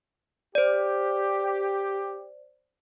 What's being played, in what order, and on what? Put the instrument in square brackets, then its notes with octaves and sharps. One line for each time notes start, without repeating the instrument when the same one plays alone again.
[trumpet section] G4 [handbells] C5 D5